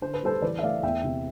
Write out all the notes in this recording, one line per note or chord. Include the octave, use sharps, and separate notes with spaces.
D3 C5
B4
G3 A4 C5
E3 B4 D5
E5
A3 D5 F5
E2 E5 G5
C3